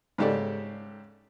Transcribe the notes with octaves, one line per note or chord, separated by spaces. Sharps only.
G#2 C#3 G4 A4 D5